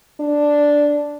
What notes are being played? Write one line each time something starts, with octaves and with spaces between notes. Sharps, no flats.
D4